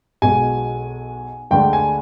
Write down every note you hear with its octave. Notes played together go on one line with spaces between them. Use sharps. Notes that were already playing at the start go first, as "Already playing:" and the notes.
B1 B2 G#3 G#5
D2 D3 G#3 D4 G5
G#5